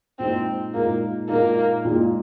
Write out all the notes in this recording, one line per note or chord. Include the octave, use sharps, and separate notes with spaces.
A#2 G#3 C4 D#4
A#2 G#3 A#3 D#4
A#2 G#3 A#3 D#4
A#2 G#3 D#4